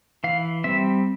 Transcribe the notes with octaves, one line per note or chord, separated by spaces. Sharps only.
E3 F5
G3 C4 E5